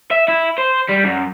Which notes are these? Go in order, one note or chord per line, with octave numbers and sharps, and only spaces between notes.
E5
E4
C5
G3
F#2